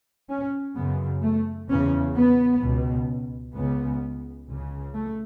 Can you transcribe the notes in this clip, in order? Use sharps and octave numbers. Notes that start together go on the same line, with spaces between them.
C#4
F#2 C#3 B3
A3
E2 C#3 C#4
B3
C#2 B2
C#2 C#3 B3
C#2 C#3
A3